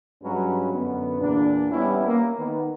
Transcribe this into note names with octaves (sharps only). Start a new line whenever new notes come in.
G2 F#3 G#3 C#4 B4
F#2 D3 B3
E2 A#2 D4
G3 B3 C#4 E4
A#3
D#3 B3